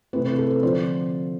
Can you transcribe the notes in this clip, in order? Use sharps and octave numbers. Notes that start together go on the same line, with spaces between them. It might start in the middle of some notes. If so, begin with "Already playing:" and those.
C3 E3 A3 C4 B4
B4
A4
B4
D3 F3 C4 C5